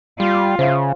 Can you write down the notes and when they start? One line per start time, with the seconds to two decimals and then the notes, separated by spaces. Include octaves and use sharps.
0.20 G3 F4
0.59 C#3 C5 E5 F5